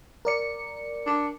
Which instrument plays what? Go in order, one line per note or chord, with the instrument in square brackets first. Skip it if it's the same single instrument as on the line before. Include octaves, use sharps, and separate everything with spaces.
[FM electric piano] A#4 D5 C#7
[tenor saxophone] D4